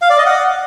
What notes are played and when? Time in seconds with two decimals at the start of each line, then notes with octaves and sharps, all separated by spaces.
0.02 F5
0.10 D5
0.18 D#5
0.26 F#5